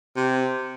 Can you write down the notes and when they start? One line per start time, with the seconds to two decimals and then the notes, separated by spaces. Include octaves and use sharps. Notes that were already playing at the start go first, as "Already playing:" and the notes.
0.16 C3